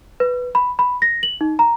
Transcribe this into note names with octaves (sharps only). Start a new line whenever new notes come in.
B4
B5
B5
A#6
F#7
D#4
A#5